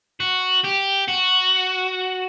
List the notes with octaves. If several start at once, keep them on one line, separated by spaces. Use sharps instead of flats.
F#4
G4
F#4